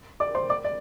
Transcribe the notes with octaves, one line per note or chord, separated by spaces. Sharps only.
D5 D6
C5 C6
D5 D6
D5